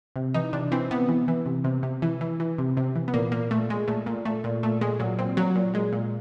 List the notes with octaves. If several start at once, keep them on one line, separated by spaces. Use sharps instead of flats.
C3
E3 D#4
C3 D4
E3 C4
C3 B3
E3
E3
C3
C3
C3
E3
E3
E3
C3
C3
E3
B3
A#2 A#3
A#2 A#3
A#2 A3
A#2 G#3
A#2 A3
A#2
A#2 A3
A#2
A#2 A3
A#2 G#3
A#2 F#3
A#2 C4
A#2 F#3
A#2
A#2 G#3
A#2